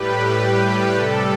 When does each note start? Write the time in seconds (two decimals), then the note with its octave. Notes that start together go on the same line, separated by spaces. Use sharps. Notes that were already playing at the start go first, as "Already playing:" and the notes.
Already playing: A2 G3 G4 B4
0.42 G4 B4
0.96 C3 G3 A4